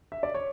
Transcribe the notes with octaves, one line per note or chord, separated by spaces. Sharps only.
E5
D5
C#5